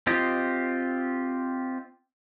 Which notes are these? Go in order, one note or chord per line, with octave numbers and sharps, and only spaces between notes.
C4 F4 G4 D#5